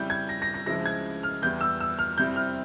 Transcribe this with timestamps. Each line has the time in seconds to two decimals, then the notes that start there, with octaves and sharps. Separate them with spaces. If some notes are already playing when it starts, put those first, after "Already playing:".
Already playing: F2 C#3 G3 C#4 E4 G6
0.10 G#6
0.29 A#6
0.42 A#6
0.54 A#6
0.66 C#2 C#3 F3 G#3 E4 A#6
0.86 G#6
1.23 F6
1.42 E2 E3 G3 G6
1.61 E6
1.80 E6
1.99 F6
2.17 F2 C3 G3 C4 E4 G6
2.36 F6